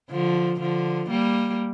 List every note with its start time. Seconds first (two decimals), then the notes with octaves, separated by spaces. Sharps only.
0.11 D3 F3
0.60 D3 F3
1.10 G3 A#3